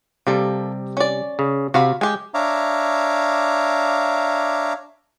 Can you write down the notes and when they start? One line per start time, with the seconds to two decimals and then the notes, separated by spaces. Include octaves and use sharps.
0.27 C3 G3 A#3 A4
0.97 C#4 D5
1.39 C#3
1.74 C3 F#4 F5 B5
2.01 G#3 G4 G#5
2.34 D4 C#5 E5 F5 A#5 D6